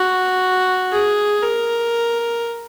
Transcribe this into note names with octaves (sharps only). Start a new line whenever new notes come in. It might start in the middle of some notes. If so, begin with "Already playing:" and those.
Already playing: F#4
G#4
A#4